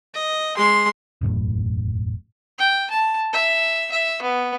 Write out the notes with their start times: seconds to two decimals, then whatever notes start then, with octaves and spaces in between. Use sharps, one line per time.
0.14 D#5
0.57 G#3 C6
1.21 E1 A1 F#2 A2
2.59 G5
2.91 A5
3.33 E5
3.92 E5
4.22 B3